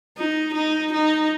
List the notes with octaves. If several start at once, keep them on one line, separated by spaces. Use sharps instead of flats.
D#4
D#4
D#4